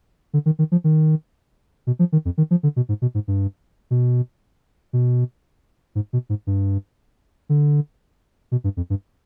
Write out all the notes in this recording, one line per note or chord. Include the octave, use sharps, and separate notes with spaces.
D3
D#3
D#3
F3
D#3
B2
F3
D#3
F2
D#3
F3
D3
B2
G#2
B2
G#2
G2
B2
B2
G#2
B2
G#2
G2
D3
B2
G2
F2
G2